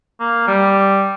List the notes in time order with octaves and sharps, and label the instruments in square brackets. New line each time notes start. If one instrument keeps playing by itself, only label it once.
[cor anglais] A#3
G3